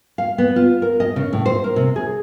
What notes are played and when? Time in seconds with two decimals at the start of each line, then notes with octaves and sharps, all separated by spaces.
0.18 F5
0.38 B3
0.56 F4
0.82 A#4
1.00 D#5
1.16 C#3
1.33 A2
1.46 C5
1.64 A#4
1.76 C3
1.96 G#4